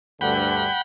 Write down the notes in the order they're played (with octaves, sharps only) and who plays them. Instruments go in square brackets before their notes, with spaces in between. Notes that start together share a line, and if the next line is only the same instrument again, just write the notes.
[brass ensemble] D2 G2 D3 [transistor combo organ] F#5 G5 B5